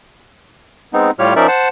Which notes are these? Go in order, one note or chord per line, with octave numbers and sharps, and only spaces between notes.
G#3 B3 C4 D#4
A2 G3 F4 G4 C#5 F6
F3 C#4 D#4 A#4 D5 E5
C5 F#5 A5